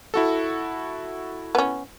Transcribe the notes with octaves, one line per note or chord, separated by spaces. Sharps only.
E4 F#4 A4
B3 C#4